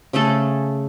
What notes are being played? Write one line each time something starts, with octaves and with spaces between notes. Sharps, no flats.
C#3 A3 G#4 A4